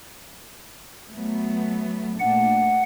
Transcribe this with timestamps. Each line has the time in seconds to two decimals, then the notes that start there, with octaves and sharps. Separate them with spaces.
1.12 F#3 A3 B3
2.20 A#2 A3 D4 F#5